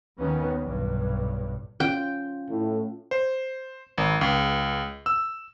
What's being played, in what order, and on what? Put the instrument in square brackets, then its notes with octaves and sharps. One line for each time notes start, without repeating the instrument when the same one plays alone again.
[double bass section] D#2 D#3 B3 C#4
B1 G2 A#2
[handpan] C#4 F4 [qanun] G5
[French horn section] A2
[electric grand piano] C5
G#1
C#2
E6